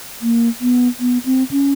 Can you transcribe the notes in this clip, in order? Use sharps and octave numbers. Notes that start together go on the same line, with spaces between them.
A#3
B3
B3
C4
C#4